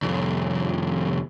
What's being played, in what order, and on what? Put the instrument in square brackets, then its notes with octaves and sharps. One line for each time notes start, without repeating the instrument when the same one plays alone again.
[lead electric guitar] C2 F2